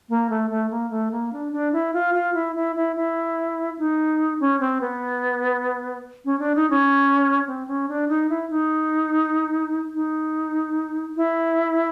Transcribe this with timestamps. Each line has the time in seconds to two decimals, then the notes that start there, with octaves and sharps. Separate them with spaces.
0.09 A#3
0.30 A3
0.51 A3
0.71 A#3
0.90 A3
1.12 A#3
1.33 D4
1.53 D4
1.73 E4
1.94 F4
2.14 F4
2.34 E4
2.56 E4
2.76 E4
2.96 E4
3.79 D#4
4.40 C#4
4.60 C4
4.81 B3
6.25 C#4
6.39 D4
6.55 D#4
6.70 C#4
7.47 C4
7.68 C#4
7.89 D4
8.09 D#4
8.30 E4
8.50 D#4
9.94 D#4
11.17 E4